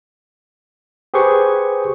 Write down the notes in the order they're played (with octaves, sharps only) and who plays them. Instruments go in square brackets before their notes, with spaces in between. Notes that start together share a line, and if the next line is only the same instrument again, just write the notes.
[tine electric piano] G4 G#4 B4 C5 C#6